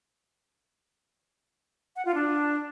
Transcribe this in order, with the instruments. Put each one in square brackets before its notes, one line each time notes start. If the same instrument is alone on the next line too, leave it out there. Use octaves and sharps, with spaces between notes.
[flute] F#5
F4
D4